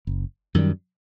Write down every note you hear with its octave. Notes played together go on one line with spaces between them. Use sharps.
F#1
F#2 D#3 G3